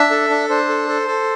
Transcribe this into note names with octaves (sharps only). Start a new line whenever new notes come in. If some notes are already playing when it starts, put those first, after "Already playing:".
Already playing: D4 E5
A4
D4
D4 C5
A4
A4
A4